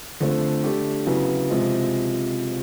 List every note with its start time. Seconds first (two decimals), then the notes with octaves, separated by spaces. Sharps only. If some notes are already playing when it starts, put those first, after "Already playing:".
0.20 D3 F3 A3 C4
0.63 A3 D4 G4
1.06 C#3 F#3 B3 E4
1.50 C3 F3 G#3